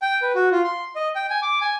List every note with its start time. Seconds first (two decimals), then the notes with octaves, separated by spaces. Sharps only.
0.02 G5
0.22 B4
0.35 F#4
0.52 F4
0.64 C6
0.96 D#5
1.15 G5
1.30 G#5
1.42 D6
1.61 G#5